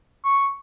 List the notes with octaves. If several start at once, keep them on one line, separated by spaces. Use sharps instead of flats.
C#6